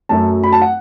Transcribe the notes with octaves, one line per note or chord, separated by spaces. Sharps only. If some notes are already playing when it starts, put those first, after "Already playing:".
F#2 F#3 A3 A5
B5
A5
F#5